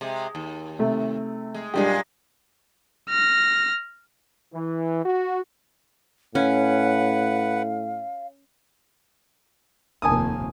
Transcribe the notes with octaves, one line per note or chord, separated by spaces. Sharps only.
C3 G#3
D#2
C3 A3
G#3
F#2 A#2 G3 G#3 D4 G4
F6 A#6
E3
F#4
A2 C#4 B4 F5 F#5
F1 D#2 A#3 G#5 A5 D#6